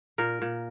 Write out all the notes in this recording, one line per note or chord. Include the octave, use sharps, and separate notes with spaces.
A#2 A#4
A#2